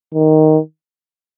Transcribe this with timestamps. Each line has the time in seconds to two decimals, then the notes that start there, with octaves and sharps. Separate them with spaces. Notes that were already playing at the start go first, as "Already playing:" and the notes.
0.14 D#3